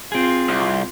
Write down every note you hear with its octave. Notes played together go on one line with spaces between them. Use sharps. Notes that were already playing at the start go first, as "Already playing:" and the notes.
C4 F4 G#4
C2